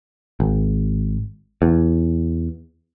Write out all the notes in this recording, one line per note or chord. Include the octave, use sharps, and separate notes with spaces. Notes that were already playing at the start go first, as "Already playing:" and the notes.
G#1
E2